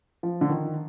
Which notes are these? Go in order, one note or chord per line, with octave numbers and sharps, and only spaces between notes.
F3
D3
D#3